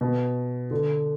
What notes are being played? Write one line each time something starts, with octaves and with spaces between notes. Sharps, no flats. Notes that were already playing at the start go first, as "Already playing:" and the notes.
B2
D3